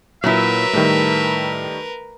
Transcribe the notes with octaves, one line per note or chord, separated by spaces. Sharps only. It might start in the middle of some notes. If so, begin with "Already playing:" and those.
A#2 F#3 E4 A#4 B4 E5
A2 D#3 G3 A3